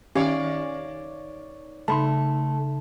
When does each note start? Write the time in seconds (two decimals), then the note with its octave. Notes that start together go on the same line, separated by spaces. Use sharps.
0.15 D#3 C#4 G4 C#5 D5 F5
1.88 C#3 A3 D#4 A5 B5 C6